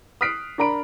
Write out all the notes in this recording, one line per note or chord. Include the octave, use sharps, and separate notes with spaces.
D#6 F6 F#6 B6 C7 D7
D4 A#4 A#5 B5 D7